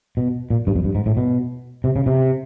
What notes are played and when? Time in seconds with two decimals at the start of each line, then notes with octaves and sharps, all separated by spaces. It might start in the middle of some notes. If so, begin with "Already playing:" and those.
0.17 B2
0.50 A#2
0.67 G2
0.75 F2
0.84 G2
0.95 G#2
1.06 A2
1.17 B2
1.84 C3
1.96 C#3
2.06 C3